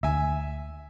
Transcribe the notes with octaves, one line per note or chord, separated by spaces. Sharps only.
D2 E5 G#5